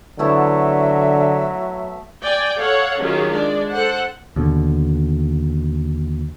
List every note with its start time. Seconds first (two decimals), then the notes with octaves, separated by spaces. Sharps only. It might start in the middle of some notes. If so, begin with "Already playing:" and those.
0.19 D3 F#3 A3 B3 E4 E5
2.23 D5 G5 G#5
2.58 A4 C#5 F5 F#5
2.99 D#3 F#3 C#4 F4 G4 G#4
3.32 G#3 D4 D5
3.70 A4 C5 F#5
4.36 D#2 B2 D3